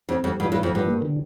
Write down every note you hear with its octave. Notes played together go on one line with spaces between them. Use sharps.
F2 C4
F2 G3
G2 F3
G2
F3
F2
G2 F3
A#3
D3